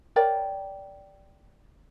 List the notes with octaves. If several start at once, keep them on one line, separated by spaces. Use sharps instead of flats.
A#4 C#5 D5 G5